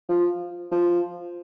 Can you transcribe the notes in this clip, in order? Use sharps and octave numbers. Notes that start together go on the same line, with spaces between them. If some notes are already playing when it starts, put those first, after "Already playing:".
F3
F3